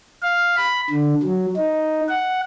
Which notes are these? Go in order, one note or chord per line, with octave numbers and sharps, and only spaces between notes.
F5
B5
D3
F#3
D#4
F#5